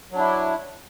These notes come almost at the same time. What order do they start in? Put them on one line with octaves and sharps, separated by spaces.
F#3 D4 E4